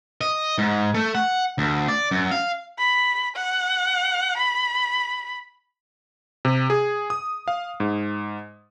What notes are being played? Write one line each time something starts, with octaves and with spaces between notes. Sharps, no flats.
D#5
G#2
A3
F#5
D2
D5
F#2
F5
B5
F#5
B5
C3
G#4
D#6
F5
G#2